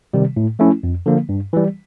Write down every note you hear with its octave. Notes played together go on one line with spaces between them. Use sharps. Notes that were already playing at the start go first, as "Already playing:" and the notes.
C3 D#3 G3
A2
F3 A3 C#4 E4
F2
D3 F3 A#3
G2
E3 G3